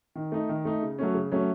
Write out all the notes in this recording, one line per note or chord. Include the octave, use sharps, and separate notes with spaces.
D#3
A3 D#4
D#3
A3 D#4
C#3
F#3 A3 C#4
C#3
F#3 A3 C#4